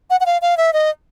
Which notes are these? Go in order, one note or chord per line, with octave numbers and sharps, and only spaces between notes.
F#5
F#5
F5
F5
E5
D#5